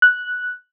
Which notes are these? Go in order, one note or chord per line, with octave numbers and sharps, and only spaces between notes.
F#6